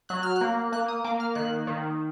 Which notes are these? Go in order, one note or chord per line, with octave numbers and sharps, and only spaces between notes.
F#3 F#6
F6
F#6
A#3
A#3 F#6
D#6
A#3 D6
F6
D#3 F#6
D#3